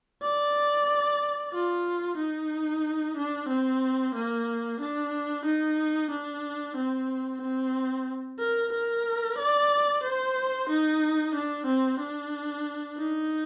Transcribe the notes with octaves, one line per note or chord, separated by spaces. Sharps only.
D5
F4
D#4
D4
C4
A#3
D4
D#4
D4
C4
C4
A#4
A#4
D5
C5
D#4
D4
C4
D4
D#4